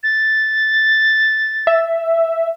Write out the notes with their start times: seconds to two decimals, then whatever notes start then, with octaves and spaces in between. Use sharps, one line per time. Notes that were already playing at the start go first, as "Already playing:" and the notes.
0.03 A6
1.67 E5